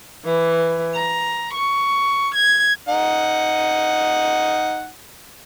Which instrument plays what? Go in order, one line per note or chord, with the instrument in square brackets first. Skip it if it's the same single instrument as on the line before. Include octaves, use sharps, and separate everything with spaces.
[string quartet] E3
A#5
C#6
G#6
[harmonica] D#4 F#5